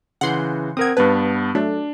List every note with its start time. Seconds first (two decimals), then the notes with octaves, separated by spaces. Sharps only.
0.21 C#3 E3 F#5 C6 G6
0.77 C4 A#4 F#5 D#6 G#6
0.97 G2 B3 B4 A5
1.55 F#3 A3 D4